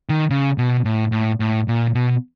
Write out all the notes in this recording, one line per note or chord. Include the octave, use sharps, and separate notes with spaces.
D#3
C#3
B2
A2
A2
A2
A#2
B2